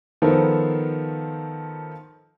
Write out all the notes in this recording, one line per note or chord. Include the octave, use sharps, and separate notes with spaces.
D#3 F3 B3 A4 A#4 C5